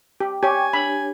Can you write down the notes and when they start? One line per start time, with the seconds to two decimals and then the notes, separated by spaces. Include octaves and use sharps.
0.20 G4 G5
0.43 G4 C#5 G5 G#5 C#6
0.73 D4 G4 C#5 B5